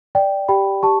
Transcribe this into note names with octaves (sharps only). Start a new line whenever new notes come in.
D5 G5
G4 G5 B5
G4 A5 C#6